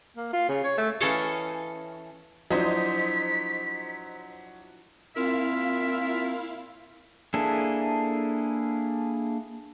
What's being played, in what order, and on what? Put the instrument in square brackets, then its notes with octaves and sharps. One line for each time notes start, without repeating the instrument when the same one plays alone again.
[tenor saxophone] A#3
F4
C#3
C#5
A3
[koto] E3 C#4 A4 C#5 D#5 F5
[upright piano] F3 D4 E4 [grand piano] F#3 [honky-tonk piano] C5 D#5 [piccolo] B6
[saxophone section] A#2 F4 A#4 [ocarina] C4 [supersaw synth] E4 F5 [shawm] E5
[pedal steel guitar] A#3 D4 E4 G#4 A4